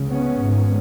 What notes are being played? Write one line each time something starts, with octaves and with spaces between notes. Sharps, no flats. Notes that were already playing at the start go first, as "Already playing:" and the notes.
Already playing: C#2 C#3
B3 C#4
G#1 G#2